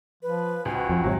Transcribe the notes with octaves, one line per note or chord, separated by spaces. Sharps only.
F3 B4
C#2 F#4 G#5
F2 F3
G#1 C3 F#3 C#5